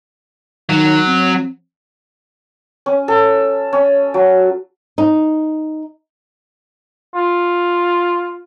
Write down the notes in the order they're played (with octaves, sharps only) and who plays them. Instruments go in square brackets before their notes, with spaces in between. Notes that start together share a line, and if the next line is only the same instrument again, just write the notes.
[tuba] D#3 [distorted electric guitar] F#3
[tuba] C4
[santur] C#4
A4
C#4
F#3
[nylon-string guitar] D#4
[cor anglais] F4